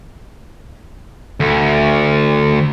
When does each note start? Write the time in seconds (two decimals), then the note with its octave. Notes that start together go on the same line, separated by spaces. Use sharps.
1.40 D2